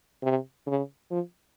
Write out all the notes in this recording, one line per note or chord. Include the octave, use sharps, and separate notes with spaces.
C3
C#3
F3